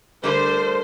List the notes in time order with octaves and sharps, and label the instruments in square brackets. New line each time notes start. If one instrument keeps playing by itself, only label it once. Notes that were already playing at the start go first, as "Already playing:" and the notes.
[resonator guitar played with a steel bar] D3 G3 A3 [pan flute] A#4 [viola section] C5